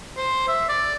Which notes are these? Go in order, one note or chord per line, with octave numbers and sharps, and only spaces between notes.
C5
E5
D5